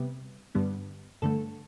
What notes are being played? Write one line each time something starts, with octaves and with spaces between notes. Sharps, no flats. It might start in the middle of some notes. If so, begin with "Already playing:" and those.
Already playing: C3 G3 B3
G2 D3 G3 B3
G2 D3 A3 A4